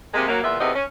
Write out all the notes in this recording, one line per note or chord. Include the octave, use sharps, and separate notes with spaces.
C3 G#3 A#3
F#3 A#3
E2 A#2 B3 F4 E5
E2 C3 D#4 A4 B4 D#5
C#4